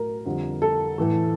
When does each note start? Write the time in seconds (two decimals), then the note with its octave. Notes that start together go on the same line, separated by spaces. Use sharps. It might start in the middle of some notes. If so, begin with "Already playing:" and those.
Already playing: A2 F#3 A3 A#4
0.26 F2 D3 G3
0.62 A4
0.98 A2 E3 A3